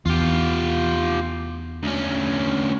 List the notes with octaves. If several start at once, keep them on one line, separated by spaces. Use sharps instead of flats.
E2 F4 G4
D2 C#4